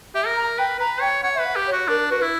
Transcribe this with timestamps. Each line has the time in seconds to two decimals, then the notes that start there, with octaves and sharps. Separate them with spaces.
0.15 G4 E5
0.26 A#4
0.36 A#5
0.58 B4 G5
0.79 B4 A#5
1.01 C#5 G5
1.23 C#5 F#5
1.35 B4 E5
1.46 F#5
1.56 G4
1.67 C#5
1.72 F#4
1.88 D4 A#4
2.10 F#4 B4
2.21 E4